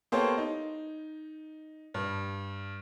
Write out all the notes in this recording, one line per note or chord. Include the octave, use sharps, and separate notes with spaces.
A#3 B3 G4 A4 C5 C#5
D#4
G2